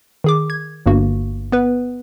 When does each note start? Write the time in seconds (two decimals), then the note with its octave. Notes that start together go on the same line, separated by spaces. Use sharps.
0.24 D#3 G#4 D6
0.50 G#6
0.86 G1 G2 A#3 F#4
1.52 B3 B4